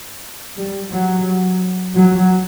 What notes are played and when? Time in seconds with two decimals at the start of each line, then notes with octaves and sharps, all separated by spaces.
0.57 G3
0.92 F#3
1.95 F#3